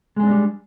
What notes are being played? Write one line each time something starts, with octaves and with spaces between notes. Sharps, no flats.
G3 G#3 C4 D4 G#4